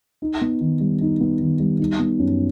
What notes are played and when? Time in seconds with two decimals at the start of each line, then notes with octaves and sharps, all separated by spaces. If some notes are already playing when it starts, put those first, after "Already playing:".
0.22 D#4
0.41 B3
0.61 D#3
0.81 G3
1.01 D#4
1.21 B3
1.41 D#3
1.60 G3
1.80 D#4
1.99 B3
2.19 F#2